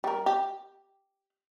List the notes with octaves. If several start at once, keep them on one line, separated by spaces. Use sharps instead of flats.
G3 A#4
G4